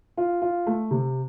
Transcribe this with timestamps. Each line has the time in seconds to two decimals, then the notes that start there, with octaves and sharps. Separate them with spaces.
0.17 F4
0.42 F4
0.67 A3
0.91 C3